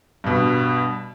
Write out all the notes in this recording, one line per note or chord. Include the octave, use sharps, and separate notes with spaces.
G2 B2